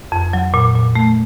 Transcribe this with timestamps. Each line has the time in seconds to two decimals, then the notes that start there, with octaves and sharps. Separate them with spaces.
0.12 F2
0.33 F#3
0.54 A#2
0.75 A#2
0.95 A3